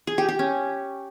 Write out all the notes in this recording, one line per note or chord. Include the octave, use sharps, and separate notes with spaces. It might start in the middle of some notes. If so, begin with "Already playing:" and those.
G#4
G4
G4
C#4